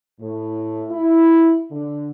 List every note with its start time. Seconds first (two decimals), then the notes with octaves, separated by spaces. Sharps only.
0.20 A2
0.90 E4
1.71 D3